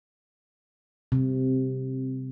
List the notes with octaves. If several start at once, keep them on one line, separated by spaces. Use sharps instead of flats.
C3